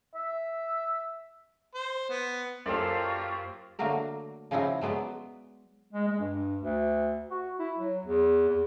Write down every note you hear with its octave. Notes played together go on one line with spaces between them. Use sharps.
E5
C5
B3
F#2 A#3 F4 G4 A4 C5 D5
C#6
D3 F#3 A3 A#3 F#4 A#4
C#3 F3 C#4 D#4 E4 F#4
F#3 G#3 B3 B4 D5
G#3
G#3
G2
D2
F#4
E4
F#3
E2
E2